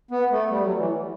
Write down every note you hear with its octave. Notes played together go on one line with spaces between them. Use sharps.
B3
A3
G3
F#3
E3